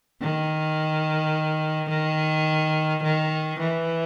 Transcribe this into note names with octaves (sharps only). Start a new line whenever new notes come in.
D#3
D#3
D#3
E3